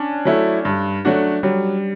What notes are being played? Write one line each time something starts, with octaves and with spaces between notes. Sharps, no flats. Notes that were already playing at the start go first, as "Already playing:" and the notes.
Already playing: C#4 D4
F#3 A3 E4
G2
F#3 A3 D4 F#4
F#3 G3